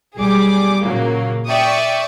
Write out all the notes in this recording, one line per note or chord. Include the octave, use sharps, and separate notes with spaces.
B1 G3 G#4 D6
A#2 C#3 F#3 A#3
D5 E5 G5 C#6 D#6